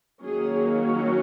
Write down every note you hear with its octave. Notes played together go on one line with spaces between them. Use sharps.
D#3 F#3 A#3 C#4 G#4
F#4